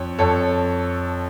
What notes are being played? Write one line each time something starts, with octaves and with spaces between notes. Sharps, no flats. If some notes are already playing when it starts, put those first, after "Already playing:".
Already playing: F2 C#5
F2 A4 C#5